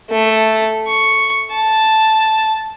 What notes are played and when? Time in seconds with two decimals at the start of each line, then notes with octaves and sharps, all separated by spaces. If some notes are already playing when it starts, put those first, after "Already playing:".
0.11 A3
0.88 C#6
1.53 A5